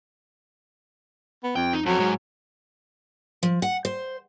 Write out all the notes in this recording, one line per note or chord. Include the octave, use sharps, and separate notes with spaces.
B3
F2 G5
D#4
F2 F#3
G#2
F3
F#5
C5